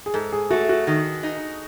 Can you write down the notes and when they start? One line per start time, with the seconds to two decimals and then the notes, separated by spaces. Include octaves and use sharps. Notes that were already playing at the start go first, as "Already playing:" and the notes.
0.06 G#4
0.14 G#2 A4
0.32 G#4
0.51 A3 F#4
0.69 F#4
0.87 D#3
1.23 D#4